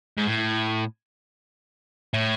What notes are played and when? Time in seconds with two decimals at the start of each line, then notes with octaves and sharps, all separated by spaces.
0.17 G#2
0.27 A2
2.14 A2